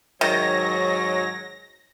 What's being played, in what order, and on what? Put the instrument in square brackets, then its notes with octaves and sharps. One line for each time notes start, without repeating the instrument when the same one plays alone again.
[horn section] G#2 F#3 [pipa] D#3 [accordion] C#5 [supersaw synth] A#6